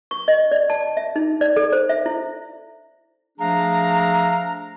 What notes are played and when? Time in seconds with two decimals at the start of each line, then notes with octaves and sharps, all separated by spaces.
0.11 C#6
0.28 D#5
0.52 D5
0.70 A5
0.97 E5
1.16 D#4
1.41 D5
1.56 A4
1.72 C5
1.89 E5
2.06 E4
3.39 F3 A3 D4 G#4 F5 A#5